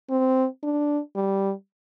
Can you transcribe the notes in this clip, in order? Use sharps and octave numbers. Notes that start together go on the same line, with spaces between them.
C4
D4
G3